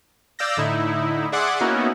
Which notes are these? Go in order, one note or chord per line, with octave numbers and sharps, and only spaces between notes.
D5 F5 E6 G6 A#6
A2 D3 D#4 E4
G#4 D5 E5 F#5 C6 D6
A#3 B3 C#4 D#4 E4 F#4